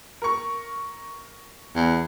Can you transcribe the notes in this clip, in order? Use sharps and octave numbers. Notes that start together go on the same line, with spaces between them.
A#4 C#6
E2